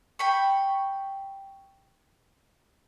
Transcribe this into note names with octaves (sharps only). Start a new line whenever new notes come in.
G5 B5 C#6